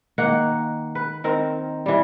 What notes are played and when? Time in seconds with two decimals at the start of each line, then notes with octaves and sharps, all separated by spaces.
0.18 D#3 A#3 F#5
0.95 B4
1.24 D#3 C4 A#4
1.86 E3 G3